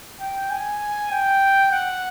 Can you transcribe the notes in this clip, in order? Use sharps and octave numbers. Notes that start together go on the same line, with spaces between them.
G5
G#5
G5
F#5